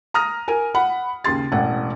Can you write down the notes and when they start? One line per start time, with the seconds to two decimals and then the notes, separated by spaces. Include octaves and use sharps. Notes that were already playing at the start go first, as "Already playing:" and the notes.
0.14 A#5 D#6 F6 A#6
0.48 A#4 G#5 D#7
0.75 F#5 B5
1.24 D#2 C#3 C6 A6
1.52 E1 A1 F#5